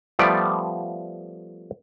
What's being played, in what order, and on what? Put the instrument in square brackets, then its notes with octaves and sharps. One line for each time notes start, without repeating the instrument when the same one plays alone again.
[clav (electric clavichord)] F3 G3 A3 B3 D5